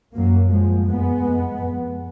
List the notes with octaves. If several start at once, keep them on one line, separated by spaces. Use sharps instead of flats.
F#2 F#3 A#3
F#2 F3 G#3
F2 G#3 B3
F2
F2